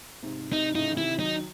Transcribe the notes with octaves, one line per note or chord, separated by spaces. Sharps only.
G#2 C3
G#2 C3 D#4
A2 C#3 D#4
E3
C3 D#3 E4
D#3 F#3 D#4